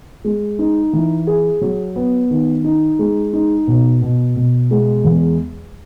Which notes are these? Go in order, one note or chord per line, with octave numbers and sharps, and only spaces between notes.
G#3
D#4
E3
G#4
F#3
B3
D#3
D#4
G#3
D#4
B2
B2
B2
G#3
E2